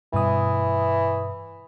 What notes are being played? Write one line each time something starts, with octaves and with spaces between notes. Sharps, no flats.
G2 B2 E3 D#6